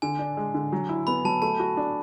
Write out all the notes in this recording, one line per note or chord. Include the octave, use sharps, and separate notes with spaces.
D3 G#5
D4
G#3
D3
F#3
E4
B3 B5
F#3 A5
A3 A5
F#4
D4